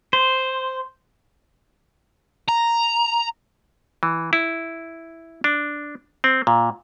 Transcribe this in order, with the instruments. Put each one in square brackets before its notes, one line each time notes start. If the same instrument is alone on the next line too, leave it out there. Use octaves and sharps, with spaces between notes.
[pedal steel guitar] C5
[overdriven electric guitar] A#5
[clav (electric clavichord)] E3
E4
D4
C4
A#2